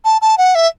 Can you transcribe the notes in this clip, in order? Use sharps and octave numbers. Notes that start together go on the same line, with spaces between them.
A5
A5
F#5
E5